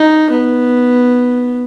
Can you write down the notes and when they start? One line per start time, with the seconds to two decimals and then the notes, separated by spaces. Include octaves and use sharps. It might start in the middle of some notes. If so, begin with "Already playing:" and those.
Already playing: D#4
0.30 B3